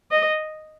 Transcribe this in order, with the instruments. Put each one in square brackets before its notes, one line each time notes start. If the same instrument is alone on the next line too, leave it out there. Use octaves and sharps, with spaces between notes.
[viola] D#5